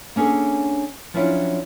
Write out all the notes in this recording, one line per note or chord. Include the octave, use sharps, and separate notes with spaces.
A#3 C#4 D4 G#4 A4
F3 F#3 C#4 D4 E4 F4